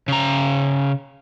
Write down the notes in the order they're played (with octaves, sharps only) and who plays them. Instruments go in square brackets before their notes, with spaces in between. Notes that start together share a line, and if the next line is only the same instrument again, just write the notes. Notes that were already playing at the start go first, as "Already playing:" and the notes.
[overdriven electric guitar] C#3 A#5